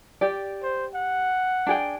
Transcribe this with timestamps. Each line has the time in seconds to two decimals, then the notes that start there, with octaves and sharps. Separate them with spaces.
0.21 G4 D5
0.63 C5
0.94 F#5
1.67 D4 G#4 G5